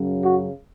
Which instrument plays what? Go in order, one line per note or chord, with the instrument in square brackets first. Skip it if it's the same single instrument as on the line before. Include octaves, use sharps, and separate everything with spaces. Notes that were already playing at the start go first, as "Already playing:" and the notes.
Already playing: [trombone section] F#2 C#3 F#3
F#4